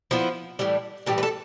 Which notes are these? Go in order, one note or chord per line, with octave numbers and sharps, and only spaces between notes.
F3 B3 E4
A2 E3 G3
A2 E3 G3 G4
B4
A4